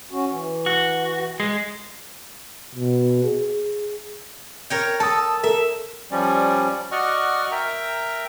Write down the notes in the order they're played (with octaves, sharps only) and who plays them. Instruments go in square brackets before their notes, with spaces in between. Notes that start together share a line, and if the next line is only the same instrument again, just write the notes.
[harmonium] C#4 F#4
E3
[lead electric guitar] F#4
G#3
[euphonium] B2
G#4
[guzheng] A#4 C#5 G5
[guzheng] A4 [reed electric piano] A5 D#6
[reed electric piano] A4 A#4 [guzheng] E5
[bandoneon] F3 G3 C#4 [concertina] D5
[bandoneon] F#4 C#6 F6 [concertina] D5 D#5 F#5
[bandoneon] A#4 A#5 [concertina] E5 G5